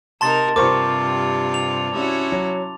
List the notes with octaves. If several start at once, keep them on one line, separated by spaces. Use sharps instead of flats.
C3 D#4 A#4 A5 C6 A6
G2 C3 F4 A#4 C5 C#6 D6
F7
C#4 E4 F#4
F#3